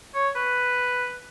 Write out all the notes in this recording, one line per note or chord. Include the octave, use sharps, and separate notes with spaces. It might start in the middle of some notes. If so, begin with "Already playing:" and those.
C#5
B4